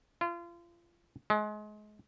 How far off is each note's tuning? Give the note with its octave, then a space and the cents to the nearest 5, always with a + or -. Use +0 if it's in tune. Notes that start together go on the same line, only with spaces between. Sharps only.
F4 -30
G#3 +30